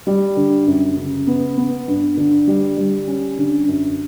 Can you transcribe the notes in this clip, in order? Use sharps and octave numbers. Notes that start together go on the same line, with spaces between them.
G3
D3
F#2
C#3
B3
B3
G2
D3
G3
G3
C#4
D3
F#2